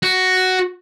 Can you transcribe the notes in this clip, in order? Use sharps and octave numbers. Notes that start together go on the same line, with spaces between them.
F#4